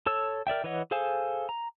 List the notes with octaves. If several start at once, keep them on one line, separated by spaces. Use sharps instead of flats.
A4 C#5 E6
A#4 D5 E5 G5
E3 B4 C#5 D#5 F#5
G#4 A4 C5 F5 G#5
A#5